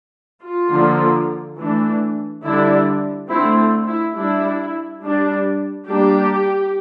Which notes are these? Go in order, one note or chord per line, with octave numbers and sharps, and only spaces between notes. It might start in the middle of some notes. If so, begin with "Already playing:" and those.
F4
D3 F3 A#3
E3 A3 D4
D3 G3 D4 E4
D3 A3 C4 E4
E4
G3 D4 E4
G3 D4
G3 A#3 D4 G4